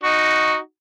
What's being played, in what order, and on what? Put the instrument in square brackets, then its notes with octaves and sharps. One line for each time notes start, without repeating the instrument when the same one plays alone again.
[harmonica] D#4 F#4